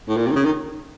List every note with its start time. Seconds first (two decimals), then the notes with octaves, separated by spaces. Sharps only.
0.08 A2
0.17 A#2
0.27 C3
0.31 D#3
0.36 C#3
0.45 D#3